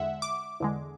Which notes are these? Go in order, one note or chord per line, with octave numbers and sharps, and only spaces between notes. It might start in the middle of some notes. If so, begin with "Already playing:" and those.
Already playing: E2 D3 G#3 E5 F#5
D6
E2 D3 G#3